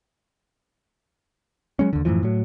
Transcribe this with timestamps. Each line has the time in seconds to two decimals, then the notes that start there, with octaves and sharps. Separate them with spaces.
1.79 F#3 G#3 C#4
1.93 D#2 D3
2.05 F#2 A2 E3 F3
2.23 A2 F#3